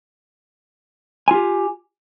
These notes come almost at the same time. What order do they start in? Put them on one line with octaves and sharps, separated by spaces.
G#5 F4 G4